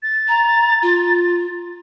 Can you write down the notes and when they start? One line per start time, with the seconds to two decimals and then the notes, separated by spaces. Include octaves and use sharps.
0.03 A6
0.28 A#5
0.82 F4